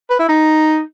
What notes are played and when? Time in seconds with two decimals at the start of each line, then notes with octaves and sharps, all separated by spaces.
0.10 B4
0.19 E4
0.29 D#4